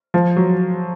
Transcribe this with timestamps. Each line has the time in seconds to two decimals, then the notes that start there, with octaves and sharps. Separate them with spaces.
0.14 F3
0.37 F#3